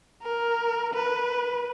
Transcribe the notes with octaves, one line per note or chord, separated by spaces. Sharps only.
A#4
B4